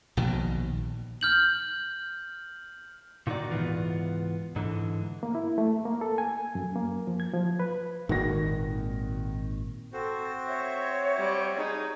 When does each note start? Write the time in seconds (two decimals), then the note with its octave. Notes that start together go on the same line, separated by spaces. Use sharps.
0.17 A#1 B2 D#3
1.21 F6 G6 F#7
3.27 A#2 D#3 D#4 F#4 D5
3.51 C#2 G#2 E3 B3 F4
4.56 G#2 D3 E3
5.23 A#3
5.35 E4
5.58 A3
5.85 A#3
6.01 A4
6.18 G#5
6.55 F#2
6.76 A#3
7.07 F3
7.20 G#6
7.33 F3
7.60 B4
8.09 G#1 A#2 D#3 G#3 F#4 A#6
9.93 C4 F#4 A4 C5
10.48 C#5 E5
11.16 G3
11.57 D#4 G#4